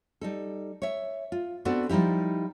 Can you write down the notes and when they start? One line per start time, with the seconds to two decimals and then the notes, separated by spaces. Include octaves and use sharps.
0.21 G3 D#4 A4
0.82 C#5 E5
1.32 F4
1.65 B3 C4 D4 F#4 A4 B4
1.89 F3 G3 D#4 E4 G4